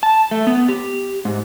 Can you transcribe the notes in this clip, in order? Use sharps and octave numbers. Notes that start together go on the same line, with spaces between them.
A5
A3
B3
G4
G#2